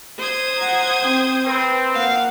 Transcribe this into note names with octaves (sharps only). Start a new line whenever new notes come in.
C5 D#6 G#6
F#5 A#5
C4 G5
C4 B4
A#3 F5 F#5